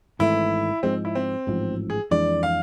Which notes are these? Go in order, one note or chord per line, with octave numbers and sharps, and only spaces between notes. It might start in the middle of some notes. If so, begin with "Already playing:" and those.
G#1 G#2 E3 A3 E4
G#2 F3 G#3 C4
E4
C4
A1 G#2 F3
G#4
F2 E3 G#3 D4 D5
F5